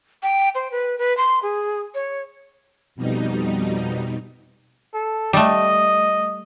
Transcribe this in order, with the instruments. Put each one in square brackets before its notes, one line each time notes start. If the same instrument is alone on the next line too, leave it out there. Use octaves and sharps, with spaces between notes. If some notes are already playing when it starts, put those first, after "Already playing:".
[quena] G5
C5
B4
B4
C6
G#4
C#5
[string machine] F2 B2 G3 D#4
[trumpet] A4
[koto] G3 A3 [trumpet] D#5